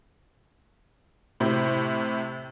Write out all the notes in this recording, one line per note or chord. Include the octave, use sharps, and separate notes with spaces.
A2 C3